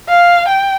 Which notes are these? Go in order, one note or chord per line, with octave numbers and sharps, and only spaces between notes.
F5
G5